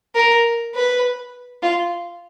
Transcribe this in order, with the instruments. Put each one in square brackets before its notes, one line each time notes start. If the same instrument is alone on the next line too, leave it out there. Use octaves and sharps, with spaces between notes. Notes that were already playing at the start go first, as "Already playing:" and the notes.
[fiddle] A#4
B4
F4